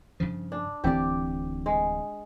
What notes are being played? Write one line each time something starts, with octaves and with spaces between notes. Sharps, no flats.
G2 C#3 F3
D4
D1 E3 C4 G4 D5
G#3